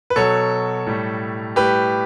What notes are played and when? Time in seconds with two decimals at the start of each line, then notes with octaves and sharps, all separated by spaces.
0.10 B4
0.16 B2 F#3 A4 C#5
0.87 A2 G3
1.56 A2 G3 G4 B4